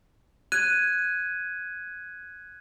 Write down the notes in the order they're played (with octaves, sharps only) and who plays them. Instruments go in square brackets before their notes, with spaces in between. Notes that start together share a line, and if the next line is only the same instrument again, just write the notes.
[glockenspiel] F#6 G#6 D#7